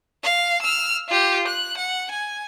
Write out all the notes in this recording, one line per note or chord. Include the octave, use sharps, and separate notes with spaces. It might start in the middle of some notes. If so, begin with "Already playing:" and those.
F5
E6 F6
F4 G4
F#6
F#5
G#5